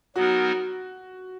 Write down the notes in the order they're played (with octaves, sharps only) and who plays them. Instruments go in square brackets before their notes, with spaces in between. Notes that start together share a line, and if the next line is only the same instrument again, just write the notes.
[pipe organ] F#3 B3 D#4 A#4 [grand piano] F#4